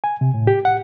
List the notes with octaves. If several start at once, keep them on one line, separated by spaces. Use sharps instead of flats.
G#5
C3
A2
G4
F#5